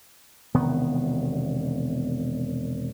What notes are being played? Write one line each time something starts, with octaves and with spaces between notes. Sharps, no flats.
E1 C3 D#3 B3